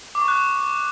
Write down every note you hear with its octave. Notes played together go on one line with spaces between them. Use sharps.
D6
C#6
F#6